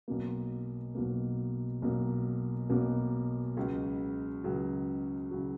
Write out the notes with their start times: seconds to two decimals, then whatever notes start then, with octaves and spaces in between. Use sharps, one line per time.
0.08 B1 B2 F#3 A#3
0.95 B1 B2 F#3 A#3
1.82 B1 B2 F#3 A#3
2.69 B1 B2 F#3 A#3
3.57 C#2 C#3 F#3
4.44 C#2 C#3 F#3
5.31 C#3 F#3